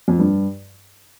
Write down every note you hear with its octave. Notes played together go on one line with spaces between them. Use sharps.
F2
G2